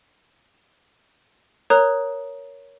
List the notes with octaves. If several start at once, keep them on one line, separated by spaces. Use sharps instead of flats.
A#4 C#5 A#5 D#6 F#6